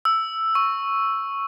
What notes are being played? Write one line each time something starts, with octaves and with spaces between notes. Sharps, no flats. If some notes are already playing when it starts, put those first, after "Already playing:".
E6
C#6